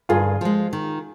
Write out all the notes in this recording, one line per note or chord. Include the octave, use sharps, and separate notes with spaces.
G2 F4 G#4
F3 G#3
D#3